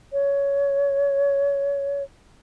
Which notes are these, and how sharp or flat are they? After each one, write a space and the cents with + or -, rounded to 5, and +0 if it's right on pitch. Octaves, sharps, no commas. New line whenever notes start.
C#5 +15